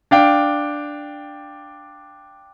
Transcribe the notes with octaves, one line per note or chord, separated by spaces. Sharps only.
D4 F5 G5